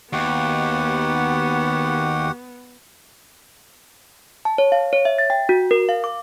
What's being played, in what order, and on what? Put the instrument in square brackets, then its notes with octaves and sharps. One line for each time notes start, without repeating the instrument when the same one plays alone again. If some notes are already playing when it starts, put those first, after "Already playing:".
[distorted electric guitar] D#2 [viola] B3 [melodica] F#4 G4 F#5
[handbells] A5
C#5
F5
C#5
E5
A6
G5
F#4
A#4
F5
D6